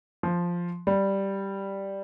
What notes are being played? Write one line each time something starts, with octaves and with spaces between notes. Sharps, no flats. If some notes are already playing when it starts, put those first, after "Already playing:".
F3
G3